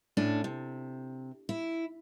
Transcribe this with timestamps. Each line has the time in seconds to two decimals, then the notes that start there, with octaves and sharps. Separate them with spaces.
0.17 A2 C#4 D4
0.44 C3
1.49 E4